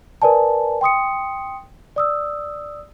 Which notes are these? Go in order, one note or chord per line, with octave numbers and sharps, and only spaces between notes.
A#4 B4 D5 G#5 A5
G5 C6 D#6 C#7
D5 D#6 E6